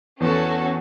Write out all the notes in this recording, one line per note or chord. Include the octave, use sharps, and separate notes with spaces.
E2 C#4 F#4 A4